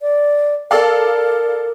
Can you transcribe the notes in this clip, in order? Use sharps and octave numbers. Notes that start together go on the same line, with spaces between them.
D5
A4 A#4 D5 F5